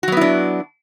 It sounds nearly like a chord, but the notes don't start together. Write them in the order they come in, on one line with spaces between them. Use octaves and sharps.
F#4 F#3 B3 E4 D4